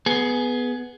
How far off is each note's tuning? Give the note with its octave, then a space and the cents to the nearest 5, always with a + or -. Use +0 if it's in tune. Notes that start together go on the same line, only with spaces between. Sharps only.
B3 +0 G#4 +20